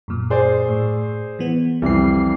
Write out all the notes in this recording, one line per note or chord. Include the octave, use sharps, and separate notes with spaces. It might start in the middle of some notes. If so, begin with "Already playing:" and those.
F#2 A#2
G#4 C5 D5
A2
E3 B3
C2 F2 E3 G3 C7